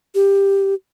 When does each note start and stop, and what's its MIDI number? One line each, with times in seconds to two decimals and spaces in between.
0.15 0.74 67